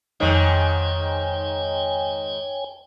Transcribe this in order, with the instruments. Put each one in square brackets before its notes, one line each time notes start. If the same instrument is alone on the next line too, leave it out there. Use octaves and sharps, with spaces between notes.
[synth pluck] F2 D#5 [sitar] G#2 D#3 [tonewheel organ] C#5 G5 G#5